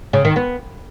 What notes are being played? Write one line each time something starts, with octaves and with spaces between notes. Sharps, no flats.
C#3
D#3
B3